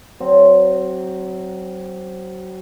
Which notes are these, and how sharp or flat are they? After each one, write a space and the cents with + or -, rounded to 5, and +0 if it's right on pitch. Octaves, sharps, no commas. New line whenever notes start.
F#3 +25 C4 +5